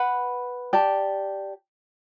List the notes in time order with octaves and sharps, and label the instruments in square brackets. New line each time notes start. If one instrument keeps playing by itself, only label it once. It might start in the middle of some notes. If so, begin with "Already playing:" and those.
Already playing: [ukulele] B4 F#5 B5
G4 D5 A5